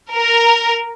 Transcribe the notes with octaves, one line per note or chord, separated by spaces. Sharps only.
A#4